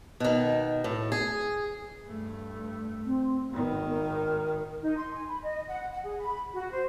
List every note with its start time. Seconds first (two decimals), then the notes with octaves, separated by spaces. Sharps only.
0.20 B2 D#3
0.84 A2
1.12 G#4
2.07 G2 A3
3.06 C4
3.51 G#1 D#3 B3
3.88 A#4
4.82 D#4
4.96 C6
5.13 G#5
5.27 B5
5.43 D#5
5.68 F#5
5.90 F#5
6.03 G#4
6.18 B5
6.53 F#4
6.71 C5